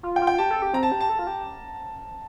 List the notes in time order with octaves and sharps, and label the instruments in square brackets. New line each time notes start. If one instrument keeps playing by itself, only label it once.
[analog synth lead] F4
[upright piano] G5
[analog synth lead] F4
[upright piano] G5
[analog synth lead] G4 [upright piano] A5
[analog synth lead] A4
G4
[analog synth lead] C4 [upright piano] A#5
[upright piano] A5
[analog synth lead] G4
[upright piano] A5
[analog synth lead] A4
F4
G4